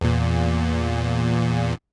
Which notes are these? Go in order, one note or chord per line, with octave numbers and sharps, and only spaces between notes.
E2 A#2